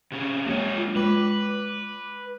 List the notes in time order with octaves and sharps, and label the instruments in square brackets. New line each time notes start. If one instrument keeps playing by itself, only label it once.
[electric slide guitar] C3 C#4 G#4
[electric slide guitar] F#3 D4 C#5 [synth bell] G#3 A#3
[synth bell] F4
[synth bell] G#3 D6 [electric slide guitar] B4